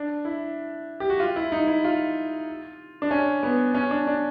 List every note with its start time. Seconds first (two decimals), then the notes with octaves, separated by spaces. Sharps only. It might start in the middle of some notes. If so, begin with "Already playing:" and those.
Already playing: D4
0.25 E4
1.00 G4
1.10 F#4
1.20 F4
1.36 E4
1.52 D#4
1.68 E4
1.84 F4
3.02 D4
3.11 C#4
3.43 B3
3.74 C#4
3.91 D4
4.07 D4